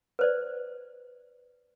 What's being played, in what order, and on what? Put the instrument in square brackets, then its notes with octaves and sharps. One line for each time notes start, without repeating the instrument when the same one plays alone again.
[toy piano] B4 C5 D5